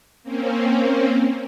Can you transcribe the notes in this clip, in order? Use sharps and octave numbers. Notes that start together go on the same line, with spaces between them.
A#3 C4 C#4